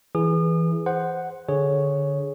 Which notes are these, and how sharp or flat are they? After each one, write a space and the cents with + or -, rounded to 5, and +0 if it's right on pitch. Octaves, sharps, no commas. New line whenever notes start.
E3 +0 G#4 +0 D#6 -40
C5 +0 F#5 +0
D3 +0 G#4 +0 C#5 +0